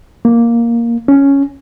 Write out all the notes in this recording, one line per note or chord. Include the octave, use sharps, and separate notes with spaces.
A#3
C#4